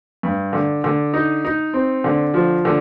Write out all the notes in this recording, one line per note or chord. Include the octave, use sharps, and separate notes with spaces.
G2
D3
D3
D#4
D#4
C4
D3
F3
D3